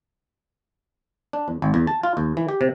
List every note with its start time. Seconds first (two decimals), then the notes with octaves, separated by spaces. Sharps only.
1.33 D4
1.48 E2
1.62 G#1
1.74 E2
1.87 A5
2.03 F4
2.17 D#2
2.37 E3
2.49 G4
2.61 C3